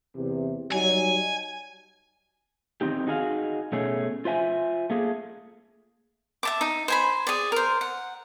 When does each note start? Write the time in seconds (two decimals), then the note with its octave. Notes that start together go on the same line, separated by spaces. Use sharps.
0.16 E2 C3
0.72 F#3 G3 D#4 G#5
2.81 D#3 E3 C4 D#4 G4
3.07 D#4 F#4 G#4 E5 F5
3.72 B2 A3 C#4 G#4
4.25 F4 C5 E5 G#5
4.90 A3 A#3 G#4
6.43 E5 A5 D6
6.61 D#4
6.88 C5 G#5 B5
7.27 G#4 D5
7.52 A#4 C5
7.81 F#5